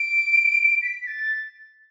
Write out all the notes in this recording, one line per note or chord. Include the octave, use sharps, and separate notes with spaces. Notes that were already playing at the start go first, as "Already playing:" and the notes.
Already playing: D7
B6
A6